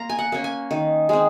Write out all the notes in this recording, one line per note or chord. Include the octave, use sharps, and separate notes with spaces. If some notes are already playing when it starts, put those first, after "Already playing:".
Already playing: A#3 A#5 C6
G#5
F#5
A#3 C#4
G#5
D#3
G#3 C4